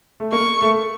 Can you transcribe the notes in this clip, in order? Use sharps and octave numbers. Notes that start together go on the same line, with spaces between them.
A3
A#3 C#6
A3